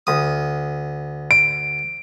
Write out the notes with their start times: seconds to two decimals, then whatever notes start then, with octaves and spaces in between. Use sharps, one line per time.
0.07 D2 D#6
1.31 D7